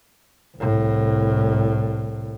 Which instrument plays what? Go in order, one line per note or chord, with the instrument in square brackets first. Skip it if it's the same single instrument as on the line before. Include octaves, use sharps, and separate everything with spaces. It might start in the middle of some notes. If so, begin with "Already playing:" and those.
[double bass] C2 A2